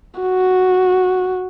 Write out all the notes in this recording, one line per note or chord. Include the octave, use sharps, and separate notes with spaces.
F#4